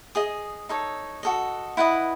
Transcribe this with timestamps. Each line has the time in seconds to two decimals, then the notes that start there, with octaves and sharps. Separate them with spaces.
0.15 G#4 D#5 D#6
0.69 D#4 A4 C#5
1.23 F#4 A4 D#5
1.77 E4 B4 D#5 F#5